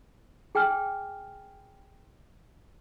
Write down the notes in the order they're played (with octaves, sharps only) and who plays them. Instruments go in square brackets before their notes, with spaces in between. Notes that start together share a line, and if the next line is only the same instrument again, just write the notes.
[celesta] G#4 G5 G#5 F6